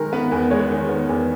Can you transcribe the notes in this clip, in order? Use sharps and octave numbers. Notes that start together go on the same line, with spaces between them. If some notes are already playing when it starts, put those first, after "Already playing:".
Already playing: D#3 G#3 A#4
B3 B4
E2
G#3 C#5
D#3
B3
E2